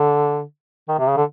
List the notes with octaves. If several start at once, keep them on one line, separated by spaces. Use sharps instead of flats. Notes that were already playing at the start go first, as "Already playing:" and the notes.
Already playing: D3
D#3
C3
C#3
D3